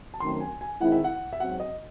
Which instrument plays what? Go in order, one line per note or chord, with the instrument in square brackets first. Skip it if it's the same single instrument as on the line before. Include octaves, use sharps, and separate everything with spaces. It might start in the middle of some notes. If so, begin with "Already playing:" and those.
[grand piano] A5
[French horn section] F#2 D#3 A3 C4 [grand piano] C6
[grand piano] G#5
G#5
[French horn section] D#3 G#3 C4 E4 [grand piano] F#5
[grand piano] E5
F#5
E5
[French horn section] G#2 F#3 C4 F#4 [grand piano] F#5
[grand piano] D#5